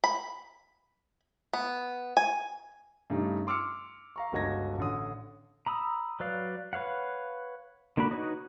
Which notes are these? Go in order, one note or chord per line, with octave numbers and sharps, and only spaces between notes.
B5
B3
G#5
G2 C#3 G3 A3 D#4
C6 D6 E6 F6 C#7
F5 A#5 C#6
G1 C#2 F#4 D#5 G#6 A#6
A1 D3 D#6
A#5 B5 D#6 E6
F#3 B4 D5 F5
B4 C#5 F5 F#5
D3 A#3 D4 F#4 B5
D#4 F#4 B4 C#5 D#5